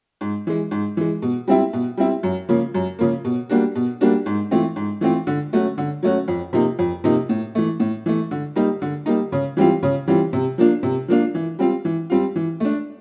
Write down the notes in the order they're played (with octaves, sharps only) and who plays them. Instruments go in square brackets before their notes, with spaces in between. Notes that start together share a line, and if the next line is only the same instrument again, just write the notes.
[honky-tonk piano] G#2
E3 G#3
G#2
E3 G#3
B2
G3 C4 E4
B2
G3 C4 E4
F#2
C#3 F3 A#3
F#2
C#3 F3 A#3
B2
G3 A#3 D4 F#4
B2
G3 A#3 D4 F#4
G#2
E3 A3 C4 F4
G#2
E3 A3 C4 F4
D3
F#3 A3 C#4 F#4
D3
F#3 A3 C#4 F#4
F2
C3 F3 A#3 D#4
F2
C3 F3 A#3 D#4
A2
E3 A3
A2
E3 A3
D3
G3 A#3 D#4
D3
G3 A#3 D#4
C#3
E3 G3 C4 F4
C#3
E3 G3 C4 F4
C3
F3 A#3 D4 F4
C3
F3 A#3 D4 F4
E3
G3 C4 F4
E3
G3 C4 F4
E3
A3 D4